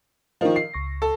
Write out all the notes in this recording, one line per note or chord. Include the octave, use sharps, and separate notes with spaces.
D#3 F3 A#4 D#5 F5
C7
C#2 C#6 A#6
A4